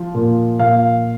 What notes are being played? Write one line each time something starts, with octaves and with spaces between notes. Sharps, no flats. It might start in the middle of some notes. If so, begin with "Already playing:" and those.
Already playing: F3
A#2
A#2 F5